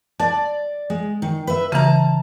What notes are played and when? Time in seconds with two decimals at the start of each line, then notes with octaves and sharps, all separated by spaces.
0.20 D5 A5
0.90 G#3
1.22 D#3
1.47 B4 E5
1.72 C#3 E3 A5 A#5